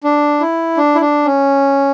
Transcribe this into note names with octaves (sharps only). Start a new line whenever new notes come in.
D4
E4
D4
E4
D4
C#4